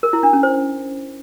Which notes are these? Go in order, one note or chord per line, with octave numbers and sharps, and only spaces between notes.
A#4
E4
D4
C#4
C5